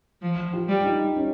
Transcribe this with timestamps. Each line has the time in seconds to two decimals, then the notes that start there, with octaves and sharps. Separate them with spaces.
0.22 F3
0.53 F4 G4
0.68 G3
0.84 D#4 F4
1.16 C#4